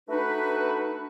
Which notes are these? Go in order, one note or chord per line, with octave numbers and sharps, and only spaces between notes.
A3 D4 D#4 F#4 B4